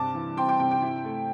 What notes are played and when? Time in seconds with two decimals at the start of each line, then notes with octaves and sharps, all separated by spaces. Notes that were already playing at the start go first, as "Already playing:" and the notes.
Already playing: G2 C3 A5 D6
0.15 E3
0.37 C4 G5 C6
0.48 G5 C6
0.60 C3 G5
0.71 G5
0.82 E4
1.05 A3